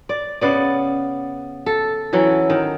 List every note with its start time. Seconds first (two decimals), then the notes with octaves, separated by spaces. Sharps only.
0.09 D5
0.41 C#3 B3 D5
1.66 A4
2.13 E3 F#3 C#4 E4
2.50 D#3